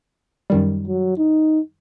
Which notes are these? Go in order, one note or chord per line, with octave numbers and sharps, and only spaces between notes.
F#2 D#3 G3
F#3
D#4